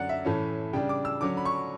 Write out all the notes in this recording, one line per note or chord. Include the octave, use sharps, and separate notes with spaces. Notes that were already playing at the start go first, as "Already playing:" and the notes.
Already playing: F#2 D3 F#3 D5 F#5
E5
A2 E3 A3 C#4
C#3 G3 D4 G5
D6
E6
D3 F#3 C#4 D6
B5
C#6